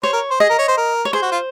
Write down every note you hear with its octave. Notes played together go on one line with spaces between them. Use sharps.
C5 C#5
A#4
C5
G#4 D#5
A#4
C#5
C5
A#4
C#5
G#4 C5
F#4
F4